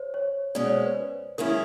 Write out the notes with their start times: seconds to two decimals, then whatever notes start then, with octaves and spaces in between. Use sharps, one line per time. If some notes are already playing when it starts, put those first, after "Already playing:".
Already playing: C5 C#5
0.14 C#5
0.55 B2 G#3 C#4 D5
0.66 C#5
0.76 C5
0.86 B4
1.38 F#2 D#3 G#3 C#4 E4 A#4